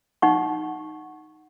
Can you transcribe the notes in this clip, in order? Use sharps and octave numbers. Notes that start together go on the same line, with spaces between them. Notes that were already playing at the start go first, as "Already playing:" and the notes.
D#4 F#5 C#6